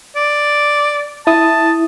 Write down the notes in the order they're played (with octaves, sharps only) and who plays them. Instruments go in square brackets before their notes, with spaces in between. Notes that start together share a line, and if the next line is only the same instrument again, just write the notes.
[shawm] D5
[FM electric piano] E4 D#6 [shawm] A5